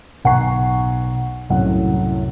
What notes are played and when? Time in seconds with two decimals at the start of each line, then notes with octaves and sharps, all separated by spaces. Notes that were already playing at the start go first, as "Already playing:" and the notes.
0.25 B1 F#5 G#5 A#5 C#6 C7
1.50 C2 F#2 A2 F#5